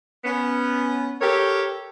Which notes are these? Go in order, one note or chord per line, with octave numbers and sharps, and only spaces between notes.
B3 C#4
G4 A4 A#4 C#5